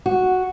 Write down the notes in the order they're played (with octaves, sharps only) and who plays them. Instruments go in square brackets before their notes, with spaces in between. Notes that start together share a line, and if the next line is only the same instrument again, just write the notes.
[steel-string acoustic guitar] F#4